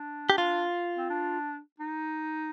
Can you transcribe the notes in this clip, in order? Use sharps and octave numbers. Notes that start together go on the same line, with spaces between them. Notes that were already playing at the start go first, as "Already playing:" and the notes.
Already playing: D4
G4
F4
C4
D4
D#4